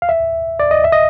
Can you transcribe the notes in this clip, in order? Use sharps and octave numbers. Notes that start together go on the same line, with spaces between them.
F5
E5
D5
D#5
E5
D#5